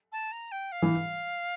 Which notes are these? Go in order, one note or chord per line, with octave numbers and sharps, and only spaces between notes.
A5
A#5
G5
F5
E3